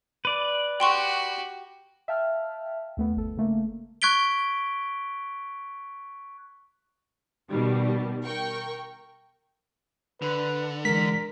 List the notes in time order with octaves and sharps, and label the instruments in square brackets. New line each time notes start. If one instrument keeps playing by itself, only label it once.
[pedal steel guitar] B4 D5
[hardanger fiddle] F#4 G4 [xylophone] G5 C6 C#6
[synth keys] E5 F5 G5 A5 F6
D#2 A3 B3
G1 A4
C#3 A3 A#3
[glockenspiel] C#6 F#6 G#6 B6 D7 G7
[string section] B2 D#3 G3
A#4 G5 C#6
[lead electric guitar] D3 [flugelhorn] B4
[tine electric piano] E3 G#3 [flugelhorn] A#4 [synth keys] B6